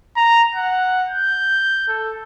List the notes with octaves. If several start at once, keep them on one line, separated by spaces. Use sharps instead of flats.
A#5
F#5
G6
A4